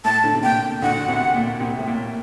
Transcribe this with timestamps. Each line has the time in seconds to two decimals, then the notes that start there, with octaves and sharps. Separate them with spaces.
0.04 A2 A5
0.24 D3
0.34 C3
0.43 A#2 G5
0.82 D2 D3 F#5
1.08 C2 C3
1.34 A#2
1.60 C2 C3
1.79 A2
1.87 A#2